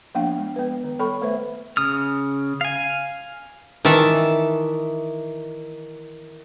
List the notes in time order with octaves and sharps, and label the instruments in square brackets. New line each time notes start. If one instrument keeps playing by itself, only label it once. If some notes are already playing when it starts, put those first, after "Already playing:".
[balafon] F3 A#3 B3 D4 F5 G5
G#3
B3 B4
D#3
G3 B3 A4 B5 C#6
A3 B4 C5 E5
[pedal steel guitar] C#3 D#6 F6
F5 G#5
[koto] D#3 E3 E5 A5